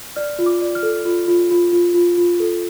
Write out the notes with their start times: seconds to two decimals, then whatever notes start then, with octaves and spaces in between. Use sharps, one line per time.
0.16 D5 F6
0.39 F4
0.46 D6
0.61 D5
0.75 F6
0.83 A4
1.05 F4
1.28 F4
1.51 F4
1.72 F4
1.94 F4
2.17 F4
2.40 A4